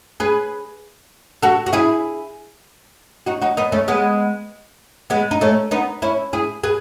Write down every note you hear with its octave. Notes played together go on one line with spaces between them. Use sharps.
G#4 B4
F#4 A4
F#4
E4 G#4
D#4 F#4
D#4 F#4
B3 D#4
A3 C#4
G#3 B3
G#3 B3
D#4
A3 C#4
B3 D#4
C#4 E4
E4 G#4
G#4 B4